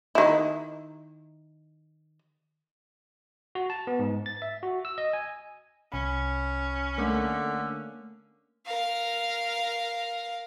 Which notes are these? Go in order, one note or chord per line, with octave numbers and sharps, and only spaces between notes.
D#3 E4
F#4
A5
B3
G#2
A6
E5
F#4
E6
D#5
G#5
C2 C#4 B5
D3 A3 A#3
A#4 F5